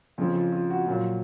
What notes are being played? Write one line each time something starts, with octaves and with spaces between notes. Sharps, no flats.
F2 C#3 F3 F4
F4
F4
F#4
A#2 F#3 F4